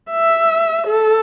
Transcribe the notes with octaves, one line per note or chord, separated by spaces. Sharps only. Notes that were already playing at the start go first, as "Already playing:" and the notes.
E5
A4